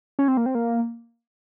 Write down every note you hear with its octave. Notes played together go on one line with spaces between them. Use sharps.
C#4
C4
A#3
C4
A#3